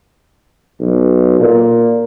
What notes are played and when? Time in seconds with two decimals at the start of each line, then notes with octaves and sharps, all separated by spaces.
0.79 B1
1.40 A#2